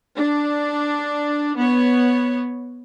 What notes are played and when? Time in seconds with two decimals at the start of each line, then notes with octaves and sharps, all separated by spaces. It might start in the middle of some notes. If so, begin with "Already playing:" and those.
0.17 D4
1.58 B3 C#5